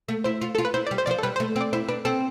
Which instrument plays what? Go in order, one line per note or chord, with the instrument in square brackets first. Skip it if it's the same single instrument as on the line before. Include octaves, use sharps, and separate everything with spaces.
[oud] A3
[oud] E4 [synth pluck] C5
[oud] F4
[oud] F4 [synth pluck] A4
[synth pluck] B4
[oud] E4 [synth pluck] C5
[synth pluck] D5
[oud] G3
[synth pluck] C5
[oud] F3 [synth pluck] D5
[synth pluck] C5
A4
[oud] G3 [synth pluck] B4
[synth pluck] C5
[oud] A3
C4
[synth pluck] D5
[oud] E4 [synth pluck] C5
[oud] D4 [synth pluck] B4
[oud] C4 [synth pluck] A4